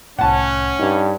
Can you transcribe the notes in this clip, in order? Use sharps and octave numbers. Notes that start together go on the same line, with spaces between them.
C2 A2 C#4 F#5 A5
G2 D#4